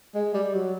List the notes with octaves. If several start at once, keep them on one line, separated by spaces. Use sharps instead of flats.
G#3
G3
F#3